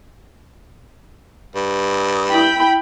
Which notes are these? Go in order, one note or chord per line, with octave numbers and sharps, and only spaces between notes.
G2
E4 G5 B5